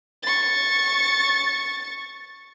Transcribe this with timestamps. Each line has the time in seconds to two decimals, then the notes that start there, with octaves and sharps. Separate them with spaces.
0.23 C#6 A6